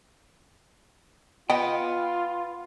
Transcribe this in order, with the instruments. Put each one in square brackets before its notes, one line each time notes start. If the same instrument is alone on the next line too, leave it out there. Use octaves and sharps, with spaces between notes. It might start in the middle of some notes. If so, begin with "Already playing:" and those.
[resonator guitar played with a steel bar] B3 [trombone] F4 [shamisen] D#5 [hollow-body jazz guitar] G5